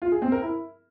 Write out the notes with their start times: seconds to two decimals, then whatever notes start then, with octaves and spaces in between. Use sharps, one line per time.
0.02 F4
0.12 G#4
0.22 C4
0.32 A#4
0.42 E4